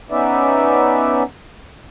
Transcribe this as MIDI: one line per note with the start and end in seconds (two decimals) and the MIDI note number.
0.11 1.23 59
0.11 1.23 61
0.11 1.23 63
0.11 1.23 71
0.11 1.23 74
0.11 1.23 76